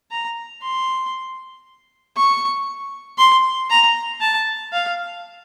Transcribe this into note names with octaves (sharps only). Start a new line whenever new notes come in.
A#5
C6
C#6
C6
A#5
A5
F5